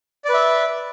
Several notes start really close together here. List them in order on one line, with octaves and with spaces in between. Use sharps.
D5 B4 E5